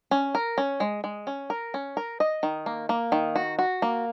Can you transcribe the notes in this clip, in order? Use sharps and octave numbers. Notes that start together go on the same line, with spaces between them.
C#4
A#4
C#4
G#3
G#3
C#4
A#4
C#4
A#4
D#5
D#3
A#3
A#3
D#3
F#4
F#4
A#3